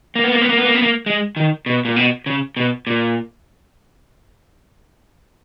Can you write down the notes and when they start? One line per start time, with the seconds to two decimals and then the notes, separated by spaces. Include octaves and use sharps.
0.15 A#3
0.24 B3
0.32 A#3
0.41 B3
0.49 A#3
0.57 B3
0.65 A#3
0.74 B3
0.82 A#3
1.06 G#3
1.36 D#3
1.66 B2
1.85 A#2
1.96 B2
2.26 C#3
2.57 B2
2.87 A#2